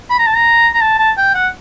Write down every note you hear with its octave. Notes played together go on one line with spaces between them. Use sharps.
B5
A#5
A5
A#5
A#5
A5
A5
G5
F#5